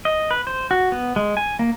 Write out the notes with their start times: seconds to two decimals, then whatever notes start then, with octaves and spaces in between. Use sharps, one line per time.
0.05 D#5
0.31 B4
0.47 C5
0.71 F#4
0.92 B3
1.16 G#3
1.37 G#5
1.59 A#3